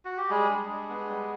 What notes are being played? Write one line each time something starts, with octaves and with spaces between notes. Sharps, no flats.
F#4
G4
G3 G#3 G#4
D4
G3
B3
G3